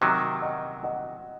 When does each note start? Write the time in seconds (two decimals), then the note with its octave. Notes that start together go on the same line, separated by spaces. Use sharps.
0.01 C3 D#3 F#3 D#5 F#5
0.42 D#5 F#5
0.83 D#5 F#5